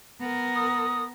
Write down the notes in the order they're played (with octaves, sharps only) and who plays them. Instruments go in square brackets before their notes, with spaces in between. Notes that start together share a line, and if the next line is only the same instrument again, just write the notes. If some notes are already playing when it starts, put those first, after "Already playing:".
[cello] B3 A#4
[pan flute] D#6